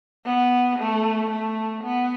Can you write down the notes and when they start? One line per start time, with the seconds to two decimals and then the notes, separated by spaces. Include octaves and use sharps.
0.26 B3
0.79 A3
1.30 A3
1.83 B3